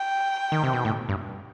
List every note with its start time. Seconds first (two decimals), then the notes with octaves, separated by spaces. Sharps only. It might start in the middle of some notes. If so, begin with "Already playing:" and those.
Already playing: G5
0.52 D#3
0.63 C3
0.73 B2
0.85 A2
1.09 G2